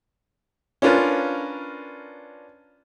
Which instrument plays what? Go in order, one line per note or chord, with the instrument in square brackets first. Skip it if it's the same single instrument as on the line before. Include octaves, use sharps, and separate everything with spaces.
[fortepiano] C#4 D4 F4 A#4 B4